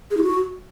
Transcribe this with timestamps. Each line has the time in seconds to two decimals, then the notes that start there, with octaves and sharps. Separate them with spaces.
0.11 G#4
0.17 E4
0.23 F#4